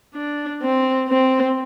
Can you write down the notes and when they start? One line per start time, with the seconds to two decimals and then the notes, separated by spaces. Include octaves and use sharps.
0.14 D4
0.62 C4
1.09 C4